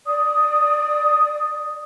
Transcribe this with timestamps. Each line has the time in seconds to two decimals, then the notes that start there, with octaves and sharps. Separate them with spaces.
0.06 D5 D#6